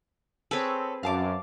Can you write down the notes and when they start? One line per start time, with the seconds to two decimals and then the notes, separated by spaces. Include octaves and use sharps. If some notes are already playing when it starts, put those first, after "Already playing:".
0.51 C4 G#4 A4 B4 C#5
1.03 F#2 F5 A5 D6